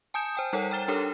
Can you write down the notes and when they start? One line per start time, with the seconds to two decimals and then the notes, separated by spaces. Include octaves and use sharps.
0.14 G#5 A5 D#6 G6 C#7 E7
0.35 C5 G5 D#6
0.53 G3 D#4 A4 A#4 C#5 F#5
0.71 G5 A#5 F6 A6 E7 G7
0.88 D4 G4 A4 A#4 C#5